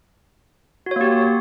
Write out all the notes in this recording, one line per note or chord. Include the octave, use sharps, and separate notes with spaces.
A#3 F#4 G4 C#5